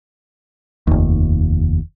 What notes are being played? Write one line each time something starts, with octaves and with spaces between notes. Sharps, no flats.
F1 D#2